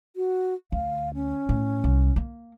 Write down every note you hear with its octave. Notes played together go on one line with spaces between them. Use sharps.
F#4
D2 F5
C#4
A2
C2
A#3